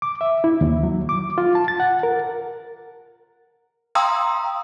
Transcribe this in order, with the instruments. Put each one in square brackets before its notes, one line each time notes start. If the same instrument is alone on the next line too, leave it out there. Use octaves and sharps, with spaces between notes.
[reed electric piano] D6
E5
E4
D#2
F#3
D6
F4
A5
A6
F#5
A#4
[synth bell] F5 G5 A#5 C6 D#6 E6